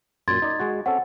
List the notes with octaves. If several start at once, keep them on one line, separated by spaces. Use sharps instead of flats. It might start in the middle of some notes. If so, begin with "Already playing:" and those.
F#2 A#2 C6 G#6 A6
D#4 D5 D#5
G#3 F#4
C4 C#4 A4 F#5